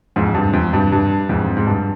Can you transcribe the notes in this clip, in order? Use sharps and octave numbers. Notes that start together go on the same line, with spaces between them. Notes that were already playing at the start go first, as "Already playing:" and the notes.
F2 G#2
G2
F2
G2
G2
F2 G#2
G#2
G2